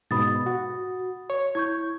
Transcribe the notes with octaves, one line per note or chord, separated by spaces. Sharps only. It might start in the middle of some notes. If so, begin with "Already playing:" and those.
G#2 B2 B5 D#6 A6
F#4
C#5
E4 C#6 G6 G#6